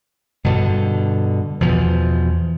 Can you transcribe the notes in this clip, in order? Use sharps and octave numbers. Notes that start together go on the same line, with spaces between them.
G2 B2 D3
E2 B2 F3